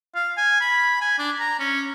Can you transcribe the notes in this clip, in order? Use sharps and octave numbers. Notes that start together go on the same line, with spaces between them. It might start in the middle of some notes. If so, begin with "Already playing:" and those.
F5
G#5
B5
G#5
D4
A#5
C#4